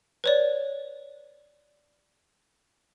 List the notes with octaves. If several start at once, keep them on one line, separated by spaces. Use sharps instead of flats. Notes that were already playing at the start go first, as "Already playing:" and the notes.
B4 C#5 D5